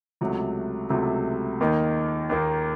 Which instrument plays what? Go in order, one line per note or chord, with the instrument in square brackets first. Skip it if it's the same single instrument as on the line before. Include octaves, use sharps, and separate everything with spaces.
[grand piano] C#2 C3 F#3 A3
C#2 C3 F#3 A3
D#2 D#3 A#3 D#4
D#2 D#3 A#3 D#4